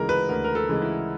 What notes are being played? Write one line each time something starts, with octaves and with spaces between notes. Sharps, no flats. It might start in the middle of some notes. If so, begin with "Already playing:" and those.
Already playing: D2 C#3 E3 G#3 A#4
B4
D2 A#4
A#4
A4
C#3 E3 G#3
E4